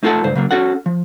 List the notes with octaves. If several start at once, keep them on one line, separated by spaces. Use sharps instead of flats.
A3 D#4 F4 A4 F#5 A5
C#2 G2 C5
C#3 F#3 A#3
C#4 F#4 A4 F#5
F3